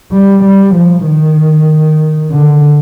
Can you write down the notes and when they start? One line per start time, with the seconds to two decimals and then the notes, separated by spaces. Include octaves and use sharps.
0.12 G3
0.44 G3
0.75 F3
1.06 D#3
2.31 D3